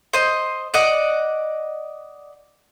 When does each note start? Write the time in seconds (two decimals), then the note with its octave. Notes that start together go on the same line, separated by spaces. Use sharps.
0.13 C5 D#5
0.74 D5 D#5 F#5